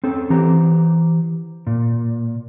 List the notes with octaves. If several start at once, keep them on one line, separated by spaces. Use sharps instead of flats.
C4 C#4 A4
E3 G4 C5 A#5
A#2